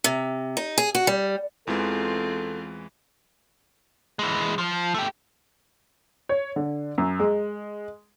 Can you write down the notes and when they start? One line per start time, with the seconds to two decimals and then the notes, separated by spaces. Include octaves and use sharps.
0.04 C3
0.57 D#4
0.78 G#4
0.95 F#4
1.07 G3
1.67 E2 E3 G#3 C4 F4 A4
4.19 E3 G#3
4.58 F3
4.94 A3 G4
6.29 C#5
6.56 D3
6.98 F#2
7.20 G#3